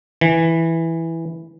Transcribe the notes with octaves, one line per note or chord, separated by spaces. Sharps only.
E3